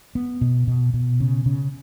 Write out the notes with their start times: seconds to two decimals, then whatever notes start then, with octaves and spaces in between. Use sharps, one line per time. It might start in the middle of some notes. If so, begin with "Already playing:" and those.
0.15 B3
0.41 B2
0.67 B2
0.94 B2
1.20 C#3
1.46 C#3